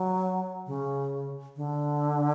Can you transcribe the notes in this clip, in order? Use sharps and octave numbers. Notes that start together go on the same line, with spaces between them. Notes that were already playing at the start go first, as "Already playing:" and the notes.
Already playing: F#3
C#3
D3